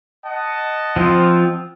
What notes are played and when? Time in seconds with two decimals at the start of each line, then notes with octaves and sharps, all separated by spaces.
0.25 D#5 F#5 A5
0.96 F3 C4 F4